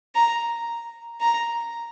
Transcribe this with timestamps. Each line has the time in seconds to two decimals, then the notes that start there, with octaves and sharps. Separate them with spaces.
0.15 A#5
1.20 A#5